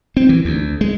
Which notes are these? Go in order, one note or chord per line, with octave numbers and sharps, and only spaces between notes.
C4
E3
D2
G#3